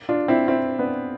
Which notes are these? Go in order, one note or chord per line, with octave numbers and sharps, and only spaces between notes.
D4 F4
C4 E4
C4 E4
B3 D4